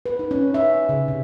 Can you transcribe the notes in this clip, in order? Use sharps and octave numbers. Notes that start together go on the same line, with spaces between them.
B4
D#4
C#4
E5
C#3
C3